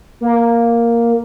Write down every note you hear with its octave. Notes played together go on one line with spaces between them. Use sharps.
A#3